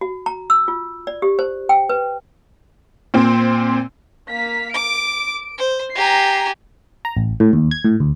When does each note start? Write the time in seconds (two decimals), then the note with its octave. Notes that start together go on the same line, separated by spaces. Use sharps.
0.01 F#4
0.26 A#5
0.50 E6
0.68 F4
1.07 D5
1.22 G4
1.39 C5
1.69 G5
1.89 B4
3.14 A#2 C4
4.27 A#3 F5 B6
4.74 D6 D7
5.58 C5
5.96 G4 G#5 A#5 A#6 C7
7.05 A#5
7.17 A1
7.40 A2
7.53 D#2
7.71 G#6
7.85 A2
8.00 D2